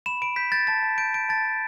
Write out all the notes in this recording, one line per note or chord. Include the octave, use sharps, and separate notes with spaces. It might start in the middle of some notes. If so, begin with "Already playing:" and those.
B5 E7
B5 D7
G6 B6
G6 A6
A5 A6
A5
G6 D7
G6 D7
A5 A6
A5